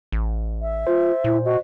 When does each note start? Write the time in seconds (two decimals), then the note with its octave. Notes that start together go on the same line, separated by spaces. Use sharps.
0.12 A1
0.62 E5
0.87 F4 C5
1.24 A#2 E4
1.45 F#4 D#5